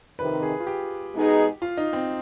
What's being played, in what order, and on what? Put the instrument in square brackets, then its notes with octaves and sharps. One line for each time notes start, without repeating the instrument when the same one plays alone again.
[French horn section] F2 C3 D#3 [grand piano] B4
[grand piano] G#4
F4
G4
[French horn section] B2 G#3 B3 D#4 G#4
[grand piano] F4
D#4
C4